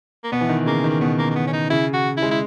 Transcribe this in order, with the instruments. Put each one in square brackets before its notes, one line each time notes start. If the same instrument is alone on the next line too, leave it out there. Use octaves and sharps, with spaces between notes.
[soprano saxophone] A#3
[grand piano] B2 [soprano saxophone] B3
[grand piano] E3
D#3
[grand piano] C#3 [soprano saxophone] A#3
[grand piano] D#3
[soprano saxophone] A#3
[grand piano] B2 [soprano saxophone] B3
[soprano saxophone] A#3
A#3
B3
C#4
D#4
[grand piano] C#3 [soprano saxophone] E4
[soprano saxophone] F#4
E4
[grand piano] G#3
[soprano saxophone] E4